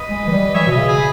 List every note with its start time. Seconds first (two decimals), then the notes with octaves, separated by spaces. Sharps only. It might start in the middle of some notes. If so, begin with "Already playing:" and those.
Already playing: B4 D#5
0.09 G#3
0.27 E3
0.32 G3
0.54 E3 C#5 E5
0.67 B2 B4 D#5
0.77 C#3
0.88 G#4 B4